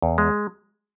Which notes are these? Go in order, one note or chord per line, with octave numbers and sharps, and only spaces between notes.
E2
G#3